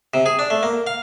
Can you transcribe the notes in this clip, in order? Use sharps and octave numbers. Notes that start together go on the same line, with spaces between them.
C3
G#4
D4
A3
A#3
F5